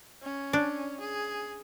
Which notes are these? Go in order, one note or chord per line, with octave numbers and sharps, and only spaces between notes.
C#4
D4
G#4